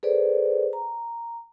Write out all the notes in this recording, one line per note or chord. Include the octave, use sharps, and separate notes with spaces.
G#4 A4 B4 C5 D5
A#5